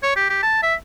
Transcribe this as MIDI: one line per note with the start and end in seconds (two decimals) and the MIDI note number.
0.03 0.12 73
0.16 0.27 67
0.29 0.38 67
0.43 0.61 81
0.63 0.75 76